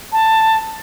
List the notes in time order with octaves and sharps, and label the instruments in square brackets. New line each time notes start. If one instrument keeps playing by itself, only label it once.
[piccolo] A5